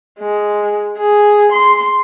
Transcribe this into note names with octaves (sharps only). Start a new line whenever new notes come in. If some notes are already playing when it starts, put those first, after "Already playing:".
G#3
G#4
C6